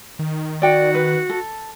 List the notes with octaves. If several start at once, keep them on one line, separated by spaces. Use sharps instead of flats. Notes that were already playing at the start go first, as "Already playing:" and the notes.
D#3
F#4 D5 G5
B4
A4